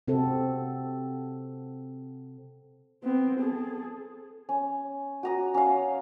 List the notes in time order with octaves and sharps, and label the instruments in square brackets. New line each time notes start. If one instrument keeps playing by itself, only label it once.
[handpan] C3 C4 F#4 A4
[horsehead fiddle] B3 C4
G#4 A4
[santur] C#4
F#4 A#5 D#6
C#4 F5